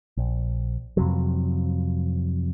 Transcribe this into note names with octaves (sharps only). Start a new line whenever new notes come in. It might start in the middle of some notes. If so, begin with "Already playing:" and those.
A#1
F2 C3 F#3